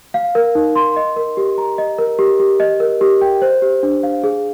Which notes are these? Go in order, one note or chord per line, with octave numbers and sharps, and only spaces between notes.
F5
A#4
D#4
C6
D#5
A#4
G4
A#5
D#5
A#4
G4
G4
D#5
A#4
G4
G5
C5
G4
D4
F5
G#4